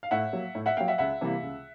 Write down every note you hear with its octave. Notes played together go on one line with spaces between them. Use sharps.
F5
A2 E5 F#5
F#3 A#3
A2
E5 F#5
F#3 A#3 F5 G5
E5 F#5
C#2 E5 F#5
C3 E3 G3 A#3
C#2